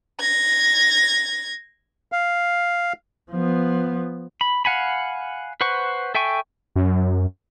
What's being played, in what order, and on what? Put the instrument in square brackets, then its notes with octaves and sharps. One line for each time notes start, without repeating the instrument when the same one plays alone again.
[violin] G#6 A#6
[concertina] F5
[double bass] F3 B3
[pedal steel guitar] B5
F5 F#5 G#5 B5
B4 C5 F#5 C#6
A4 E5 G5 G#5 C#6
[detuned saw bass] F#2